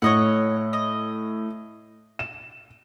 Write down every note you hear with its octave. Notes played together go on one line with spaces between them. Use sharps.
A2 C#5 D#5 F#5
D#5
E7